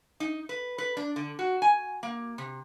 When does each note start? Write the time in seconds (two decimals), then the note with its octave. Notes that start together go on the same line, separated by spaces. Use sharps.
0.20 D#4
0.49 B4
0.78 B4
0.97 D4
1.16 D3
1.39 F#4
1.62 G#5
2.03 A#3
2.38 C3